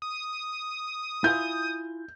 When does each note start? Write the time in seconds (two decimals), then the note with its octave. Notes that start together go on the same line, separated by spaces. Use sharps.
0.02 D#6
1.24 E4 F4 G#5 G6